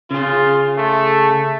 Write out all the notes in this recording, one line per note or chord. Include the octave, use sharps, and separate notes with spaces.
C#3 F4 G#4
A3